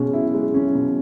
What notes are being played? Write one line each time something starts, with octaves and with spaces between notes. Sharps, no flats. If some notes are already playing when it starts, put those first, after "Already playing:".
Already playing: B2 G#3 C#4
E4
G#3
C#4
B2